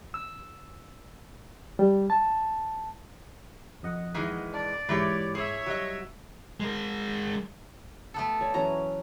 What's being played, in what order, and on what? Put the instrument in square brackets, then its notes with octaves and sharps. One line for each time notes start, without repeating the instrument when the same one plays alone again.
[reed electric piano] E6
G3
A5
[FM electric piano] F2 D#5 F#5
[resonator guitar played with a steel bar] D#3 E3 G#3
[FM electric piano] D4 [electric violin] D5
[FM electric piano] G#2 [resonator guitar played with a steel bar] E3 G4 C#5
[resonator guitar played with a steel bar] G#4 [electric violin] C#5 E5
[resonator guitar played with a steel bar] F#3 D#5 [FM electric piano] G3
[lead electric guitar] G#3 A#4
[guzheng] A3 B3 A4
[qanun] C#5 D5
[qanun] E3 F#3 C#4 [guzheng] A#5